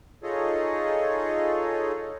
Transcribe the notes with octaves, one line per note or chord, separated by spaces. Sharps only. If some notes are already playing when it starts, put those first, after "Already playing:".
D#4 F4 G#4 A4 C#5 D#5